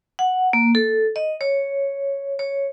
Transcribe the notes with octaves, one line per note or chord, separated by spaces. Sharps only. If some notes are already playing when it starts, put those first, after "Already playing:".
F#5
A#3
A4
D#5
C#5
C#5